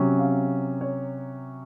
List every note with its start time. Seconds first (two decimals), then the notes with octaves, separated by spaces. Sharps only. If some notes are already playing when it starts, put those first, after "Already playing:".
Already playing: C3 F#3 C#4
0.19 F5
0.81 C#5